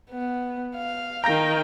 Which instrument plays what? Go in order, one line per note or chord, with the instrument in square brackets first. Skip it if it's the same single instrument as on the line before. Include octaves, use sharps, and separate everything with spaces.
[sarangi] B3
F5
[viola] D#3 G5 [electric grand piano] A#5 G6 A#6